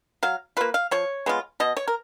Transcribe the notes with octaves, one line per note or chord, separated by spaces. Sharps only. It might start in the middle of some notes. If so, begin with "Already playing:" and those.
F#3 F5
A#3 F4 B4
F5
F3 C#5
G#3 B3 F4
B2 D#5
C#5
A#4